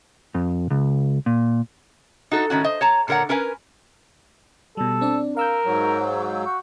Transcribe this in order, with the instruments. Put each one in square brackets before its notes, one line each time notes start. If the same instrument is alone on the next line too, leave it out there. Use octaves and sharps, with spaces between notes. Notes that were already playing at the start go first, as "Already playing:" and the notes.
[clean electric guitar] F2
C#2
A#2
[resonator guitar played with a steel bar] D#4 F#4 A4
A2 D#3 C#4 F#4
C5 D#5
C#5 A5 A#5
A#2 D3 A#4 C#5 F#5
C#4 A#4 B4 F5 G#5
[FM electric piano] B2 G3 [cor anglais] A4
[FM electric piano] C4 D4 D5
[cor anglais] A#4 [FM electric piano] F5 E6 G6
[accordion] G#2 F#3
[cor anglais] F#4